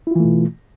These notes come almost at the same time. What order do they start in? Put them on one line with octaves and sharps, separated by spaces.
E4 F4 E3 A3 B2